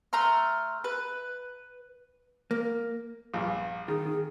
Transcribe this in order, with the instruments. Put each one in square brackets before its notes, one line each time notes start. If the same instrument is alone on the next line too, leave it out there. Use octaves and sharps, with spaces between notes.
[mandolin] A3 A#5 C6 F6
B4
[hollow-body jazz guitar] A#3
[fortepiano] A#1 G2
[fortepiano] D#3 [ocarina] G#4
[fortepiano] D#3